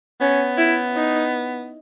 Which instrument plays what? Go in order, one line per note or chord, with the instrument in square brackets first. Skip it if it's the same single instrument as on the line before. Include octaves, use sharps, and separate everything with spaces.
[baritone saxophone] B3 [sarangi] C#4
[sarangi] E4
D#4